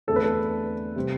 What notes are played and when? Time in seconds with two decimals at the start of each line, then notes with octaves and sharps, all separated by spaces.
0.07 E2 D3 A3 C4 A4
0.16 B4
0.24 A4
0.96 C3 G3 C4